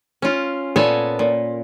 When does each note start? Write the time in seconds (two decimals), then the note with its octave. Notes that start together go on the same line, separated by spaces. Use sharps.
0.22 C#4 F4
0.76 A#2 B3 A4 C#5 G#5
1.19 A#2